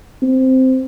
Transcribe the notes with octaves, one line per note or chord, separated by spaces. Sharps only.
C4